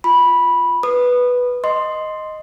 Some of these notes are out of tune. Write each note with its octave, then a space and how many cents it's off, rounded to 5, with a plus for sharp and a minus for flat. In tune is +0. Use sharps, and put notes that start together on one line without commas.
F4 +0 B5 -10
B4 +0 D#6 -25
D#5 +0 C6 +0